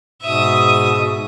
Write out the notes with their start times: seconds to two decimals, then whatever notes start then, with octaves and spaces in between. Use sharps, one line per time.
0.22 G#2 B2 E5 D#6